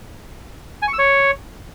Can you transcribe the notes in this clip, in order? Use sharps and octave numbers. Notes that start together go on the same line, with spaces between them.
G#5
C#6
E6
C#5